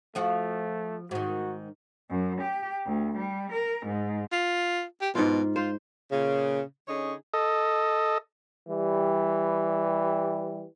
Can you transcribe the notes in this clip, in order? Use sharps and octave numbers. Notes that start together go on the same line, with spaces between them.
F3 A3 F4 F#4
G#2 D#3 F#4
F#2
G4
D2
G3
A#4
G#2
F4
G4
G#2 B2 F4
F4 C5
A#2 C#3
D3 C#4 D#4 G#4 C#5
A4 D#5
E3 G3